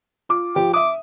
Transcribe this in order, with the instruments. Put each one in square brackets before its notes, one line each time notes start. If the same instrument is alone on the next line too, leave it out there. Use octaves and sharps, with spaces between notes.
[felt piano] F4 D6
[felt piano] F3 [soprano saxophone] G4
[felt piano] E5 D#6 [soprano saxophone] D6